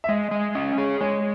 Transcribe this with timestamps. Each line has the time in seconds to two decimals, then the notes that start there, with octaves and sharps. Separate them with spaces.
0.04 E5
0.09 G#3 D#5
0.31 G#3
0.55 C#4 D#5
0.78 G#4 D#5
1.01 G#3 C#5